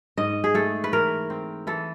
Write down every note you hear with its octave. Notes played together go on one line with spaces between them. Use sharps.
G#2 D#5
G#4
A3 A4
B4
E3 A#4
C4
E3 A4